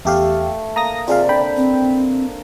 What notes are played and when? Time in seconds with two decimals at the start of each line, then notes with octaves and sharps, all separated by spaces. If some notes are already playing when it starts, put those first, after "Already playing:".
0.05 E2 A3 G4 F5
0.76 A#3 A#5 D#6 A#6
1.08 C3 F4 G#4 D5 F5
1.29 D3 G5 B5
1.57 C4